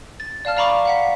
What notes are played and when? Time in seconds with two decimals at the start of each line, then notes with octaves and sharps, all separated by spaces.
0.20 A6
0.45 D5 F5 A5 F6
0.57 D5 F5 A#5 B5 C#6 D6
0.85 F5 F#5 B6